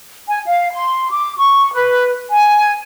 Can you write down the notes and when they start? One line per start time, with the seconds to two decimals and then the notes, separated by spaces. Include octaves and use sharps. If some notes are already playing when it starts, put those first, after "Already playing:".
0.27 G#5
0.45 F5
0.72 C6
1.09 D6
1.37 C#6
1.74 B4
2.29 G#5